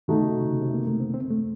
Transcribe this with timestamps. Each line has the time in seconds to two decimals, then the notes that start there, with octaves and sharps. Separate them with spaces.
0.08 D#3 A3 D#4 F#4 A4
0.21 C#3
0.34 C3
0.48 C#3
0.61 C3
0.74 A#3
0.87 A3
1.00 C4
1.14 C4
1.30 A3